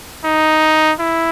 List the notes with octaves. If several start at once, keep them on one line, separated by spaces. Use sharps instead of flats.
D#4
E4